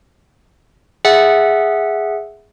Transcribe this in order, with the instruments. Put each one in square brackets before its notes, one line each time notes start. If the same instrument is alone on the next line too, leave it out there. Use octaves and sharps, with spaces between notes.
[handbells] G#4 E5 F#5